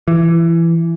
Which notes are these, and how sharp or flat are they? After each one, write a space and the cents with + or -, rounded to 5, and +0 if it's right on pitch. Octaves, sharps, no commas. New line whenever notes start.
E3 +20